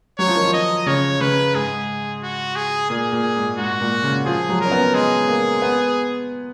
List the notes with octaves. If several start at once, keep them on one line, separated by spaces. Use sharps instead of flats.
F#3 C#5
F3
D#3
F3
D#5
C#3 C#5
C#3 B4
G#2 G#4
F#4
G#4
A#2 G#4
A#2
G#2
G#2 F#4
A#2
C#3
F3 G#4
F#3
C#4 A#4
B3
G#3 G#4
A#3
B3